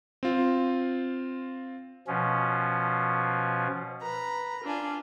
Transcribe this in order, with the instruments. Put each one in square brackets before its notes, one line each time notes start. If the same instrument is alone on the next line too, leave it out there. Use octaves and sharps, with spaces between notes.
[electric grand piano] C4 F4
[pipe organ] B2 F3 C#4
[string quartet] B4 A#5
D4 F4 G#5